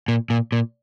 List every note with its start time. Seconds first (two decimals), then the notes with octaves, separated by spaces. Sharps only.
0.08 A#2
0.30 A#2
0.52 A#2